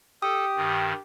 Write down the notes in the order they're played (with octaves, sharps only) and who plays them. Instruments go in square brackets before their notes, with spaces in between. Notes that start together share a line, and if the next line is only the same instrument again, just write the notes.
[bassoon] G4 [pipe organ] A4 [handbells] D#6
[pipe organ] G2 D#3